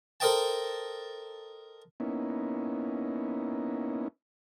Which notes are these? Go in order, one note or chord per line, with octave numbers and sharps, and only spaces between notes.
A4 A#4 C5 D#5 G5 A5
A#3 B3 C#4 D#4 E4